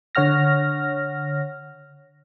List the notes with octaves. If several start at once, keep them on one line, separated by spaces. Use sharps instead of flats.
D3 C#5 F#5 F6 A#6